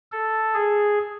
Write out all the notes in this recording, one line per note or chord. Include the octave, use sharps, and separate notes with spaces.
A4
G#4